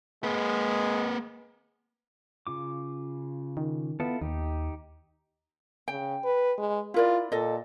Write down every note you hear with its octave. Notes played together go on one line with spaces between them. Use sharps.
G#3 A#3 B4
C#3 F4 D6
D#3
B3 E4 F4 A4
D#2 D#4 G4
C#3 G5
B4
G#3
E4 F4 A#4 D5
A#2 A4 D#5